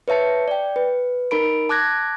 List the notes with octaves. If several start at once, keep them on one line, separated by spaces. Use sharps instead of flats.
B4 C#5 E5 A5 C#7
D5 G5
B4
D#4 A#4 B5 D7
A5 D6 F#6 G#6 A#6